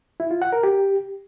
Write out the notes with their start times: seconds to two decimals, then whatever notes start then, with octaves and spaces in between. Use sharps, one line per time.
0.20 E4
0.31 F4
0.42 F#5
0.52 A#4
0.63 G4